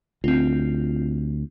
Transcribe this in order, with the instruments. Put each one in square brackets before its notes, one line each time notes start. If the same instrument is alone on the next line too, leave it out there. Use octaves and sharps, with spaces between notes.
[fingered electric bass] D2 [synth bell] C4 F4